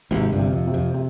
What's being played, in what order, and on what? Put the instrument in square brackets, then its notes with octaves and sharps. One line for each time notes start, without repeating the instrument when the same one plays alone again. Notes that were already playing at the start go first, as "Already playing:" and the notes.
[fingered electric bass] G#1 G#2 [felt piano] C3
[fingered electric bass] G1 G2
[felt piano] C3
[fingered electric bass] F2
[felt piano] C3
[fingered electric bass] F2
[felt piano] C3